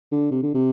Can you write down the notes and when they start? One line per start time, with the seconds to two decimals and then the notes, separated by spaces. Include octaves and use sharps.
0.11 D3
0.31 C3
0.43 D3
0.54 C3